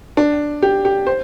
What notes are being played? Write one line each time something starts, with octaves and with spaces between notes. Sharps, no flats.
D4
G4
G4
C5